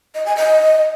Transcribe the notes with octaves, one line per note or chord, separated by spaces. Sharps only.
D#5
G#5
D#5